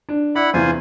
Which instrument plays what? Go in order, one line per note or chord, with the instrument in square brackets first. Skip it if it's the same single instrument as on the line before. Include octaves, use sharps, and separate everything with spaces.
[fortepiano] D4
[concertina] E4 F#5 B5 [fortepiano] D5
[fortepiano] E2 C3 E3 [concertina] F4 C5 G#5